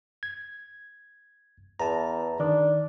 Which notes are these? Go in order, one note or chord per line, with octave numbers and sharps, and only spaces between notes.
G#6
E2 A5 A#5
D#3 D4